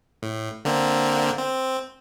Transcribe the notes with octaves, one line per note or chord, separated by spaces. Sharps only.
A2
D3 A#3 C4
C4